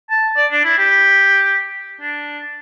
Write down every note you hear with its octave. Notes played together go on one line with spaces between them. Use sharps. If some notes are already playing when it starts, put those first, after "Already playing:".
A5
D5
D4
E4
G4
D4